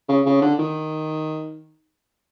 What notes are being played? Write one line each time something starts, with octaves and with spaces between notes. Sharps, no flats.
C#3
C#3
D3
D#3